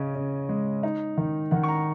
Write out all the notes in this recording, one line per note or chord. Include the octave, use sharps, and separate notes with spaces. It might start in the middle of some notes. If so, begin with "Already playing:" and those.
Already playing: C#3 C#4 D#5
C#3
G#3
D#4
D#3
D#3 F#5
C#6
A#5